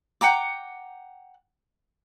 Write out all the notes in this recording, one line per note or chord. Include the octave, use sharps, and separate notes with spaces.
F#5 G5 A#5 D6